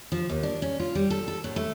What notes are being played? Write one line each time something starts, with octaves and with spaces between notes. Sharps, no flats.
F3
D#2
D4
C#4
F4
G3
A4
A4
A2
A3